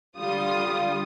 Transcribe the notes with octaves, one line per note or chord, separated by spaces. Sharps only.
D3 G3 F4 D#6